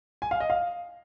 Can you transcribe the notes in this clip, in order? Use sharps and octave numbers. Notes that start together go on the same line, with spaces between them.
G#5
F5
D#5
F5